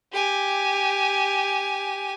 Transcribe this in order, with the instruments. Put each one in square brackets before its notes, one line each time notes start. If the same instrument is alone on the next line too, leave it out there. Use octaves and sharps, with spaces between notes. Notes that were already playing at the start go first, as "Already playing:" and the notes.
[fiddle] G4 G#5